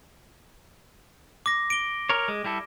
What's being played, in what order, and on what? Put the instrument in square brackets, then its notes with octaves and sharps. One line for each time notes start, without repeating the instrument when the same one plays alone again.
[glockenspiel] D6 A#6
D7 G7
[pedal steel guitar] A#4 C#5
G#3
G3 E4 A4